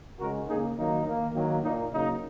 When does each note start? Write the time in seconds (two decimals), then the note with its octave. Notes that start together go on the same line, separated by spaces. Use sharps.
0.20 C#3 G#3 F#4 A#4
0.48 C#3 A#3 D#4 G#4
0.78 D#3 F#3 A#3 D#4
1.06 D#3 A#3
1.34 D#3 F#3 A#3
1.63 A#2 A#3 D#4
1.92 C#3 F#3 A#3 D#4